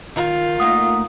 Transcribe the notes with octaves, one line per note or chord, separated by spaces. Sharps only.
D#3 F4
A3 A#3 D#4 F#5 D#6